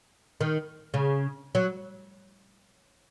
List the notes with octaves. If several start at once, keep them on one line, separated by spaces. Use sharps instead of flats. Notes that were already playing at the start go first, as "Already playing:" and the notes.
D#3
C#3
F#3